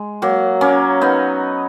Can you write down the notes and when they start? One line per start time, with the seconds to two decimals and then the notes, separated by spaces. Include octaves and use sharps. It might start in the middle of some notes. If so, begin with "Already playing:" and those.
Already playing: G#3
0.22 F#3 A#3
0.61 A#3 C#4
1.01 B3 D#4